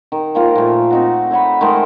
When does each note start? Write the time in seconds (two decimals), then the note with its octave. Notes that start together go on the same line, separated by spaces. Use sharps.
0.12 D#3
0.35 D#3 F3 A#3 F4
0.55 A#2 A3
0.91 C4 D#4 F#4
1.31 A4 C#5 F#5 B5
1.61 D#3 G#3 A3 C5